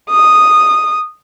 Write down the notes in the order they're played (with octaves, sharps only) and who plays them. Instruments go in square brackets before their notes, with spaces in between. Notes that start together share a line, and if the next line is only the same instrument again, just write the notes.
[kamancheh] D#6